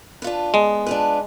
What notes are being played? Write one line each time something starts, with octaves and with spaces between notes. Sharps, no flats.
D4 F4 B4
G#3 B3
D4 F4 B4